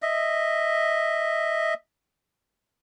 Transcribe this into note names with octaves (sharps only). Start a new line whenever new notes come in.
D#5 E5